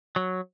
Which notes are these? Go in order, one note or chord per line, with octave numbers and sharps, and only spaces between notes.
F#3